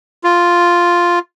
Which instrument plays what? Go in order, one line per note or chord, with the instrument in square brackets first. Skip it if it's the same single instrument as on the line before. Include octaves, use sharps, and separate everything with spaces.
[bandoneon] F4